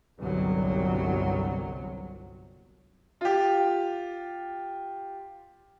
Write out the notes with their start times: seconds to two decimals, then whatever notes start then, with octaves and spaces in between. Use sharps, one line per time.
0.20 G1 C2 F#3
3.21 F4 G4